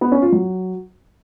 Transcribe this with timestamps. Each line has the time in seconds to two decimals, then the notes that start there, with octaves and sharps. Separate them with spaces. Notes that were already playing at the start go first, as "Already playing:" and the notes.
0.01 B3
0.12 C#4
0.22 F4
0.32 F#3